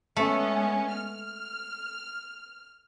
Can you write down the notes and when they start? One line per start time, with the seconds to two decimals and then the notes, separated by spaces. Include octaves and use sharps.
0.17 G#3 A3 B3 C#4
0.92 F6